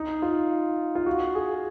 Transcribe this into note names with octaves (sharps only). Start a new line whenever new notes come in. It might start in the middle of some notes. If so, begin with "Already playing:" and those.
Already playing: D#4
F4
F4
F#4
G#4